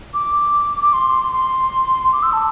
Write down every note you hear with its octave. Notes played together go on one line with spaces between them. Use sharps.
D6
D6
C6
C6
D6
E6
A5